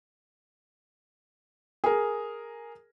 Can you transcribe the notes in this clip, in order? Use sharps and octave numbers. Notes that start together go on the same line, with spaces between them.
G#4 A#4